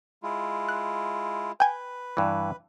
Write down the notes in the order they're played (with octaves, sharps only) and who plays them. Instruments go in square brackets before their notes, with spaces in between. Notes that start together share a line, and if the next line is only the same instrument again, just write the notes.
[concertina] G#3 E4 F4
[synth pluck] F#6
[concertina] B4 [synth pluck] G5 G#5
[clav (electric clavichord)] G2 E3